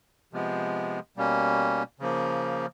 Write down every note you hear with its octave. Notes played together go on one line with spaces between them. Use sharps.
C3 F3 G#3 B3
B2 G3 A#3 C#4
C#3 F3 A#3